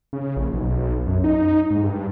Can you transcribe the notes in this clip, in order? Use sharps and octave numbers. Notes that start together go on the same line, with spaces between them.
C#3
A#1
B1
F#2
D#4
G#2
G2